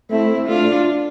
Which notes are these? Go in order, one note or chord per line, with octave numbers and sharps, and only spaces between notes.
A3 C4 E4
A3 D4 F4